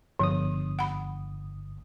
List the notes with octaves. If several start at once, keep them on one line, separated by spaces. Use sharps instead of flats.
G1 F3 D#6
F#5 B5